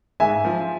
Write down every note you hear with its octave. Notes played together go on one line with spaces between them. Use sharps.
G#2 E5 G#5
F3